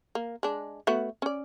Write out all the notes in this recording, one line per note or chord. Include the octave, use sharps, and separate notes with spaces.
A#3
G#3 D4
A3 B3 F#4
C#4 D5